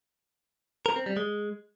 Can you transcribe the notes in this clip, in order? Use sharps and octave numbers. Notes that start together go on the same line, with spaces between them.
A#4
C4
G3
G#3